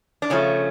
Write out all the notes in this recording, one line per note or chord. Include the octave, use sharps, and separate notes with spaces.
D4
C#3 F3 A3 C#4